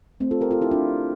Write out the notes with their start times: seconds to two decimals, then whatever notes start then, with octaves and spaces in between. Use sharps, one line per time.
0.20 A3 C4
0.31 F4 A4
0.41 G4 A#4
0.51 F4 A4
0.61 E4 G4
0.71 D4 F4